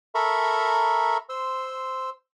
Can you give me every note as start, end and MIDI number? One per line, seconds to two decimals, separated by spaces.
0.15 1.18 69
0.15 1.18 70
0.15 1.18 76
0.15 1.18 82
0.15 1.18 83
0.15 1.18 85
1.29 2.10 72
1.29 2.10 84
1.29 2.10 88